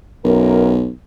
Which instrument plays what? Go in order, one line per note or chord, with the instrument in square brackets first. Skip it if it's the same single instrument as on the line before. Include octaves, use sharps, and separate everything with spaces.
[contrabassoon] B1 [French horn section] F#2 A#4